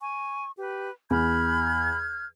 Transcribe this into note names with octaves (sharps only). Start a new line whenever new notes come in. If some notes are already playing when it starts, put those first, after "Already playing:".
G#5 C#6
G4 B4
E2 B5 F6 G6 G#6